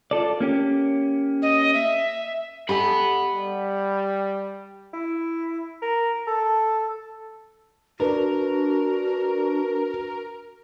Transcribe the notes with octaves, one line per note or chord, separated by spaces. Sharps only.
F4 A4 D5
A#3 C#4 G4
D#5
E5
G4 A4 D#5 F#5 G#5 B5
G3
E4
A#4
A4
D4 F#4 A#4 B4